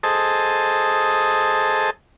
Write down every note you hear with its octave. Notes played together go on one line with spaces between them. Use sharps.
G#4 A4 C5 D#5 A5